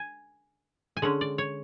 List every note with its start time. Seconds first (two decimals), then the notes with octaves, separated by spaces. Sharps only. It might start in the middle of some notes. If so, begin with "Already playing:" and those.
Already playing: G#5
0.97 G#5
1.02 D3 G#3 C#4 F#5
1.21 D5
1.38 C#5